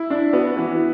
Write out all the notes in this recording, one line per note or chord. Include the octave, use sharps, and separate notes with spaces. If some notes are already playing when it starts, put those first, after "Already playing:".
Already playing: E4
D4
B3 F#4
E3